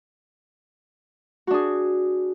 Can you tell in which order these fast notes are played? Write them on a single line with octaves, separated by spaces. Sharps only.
F#4 D4 G#4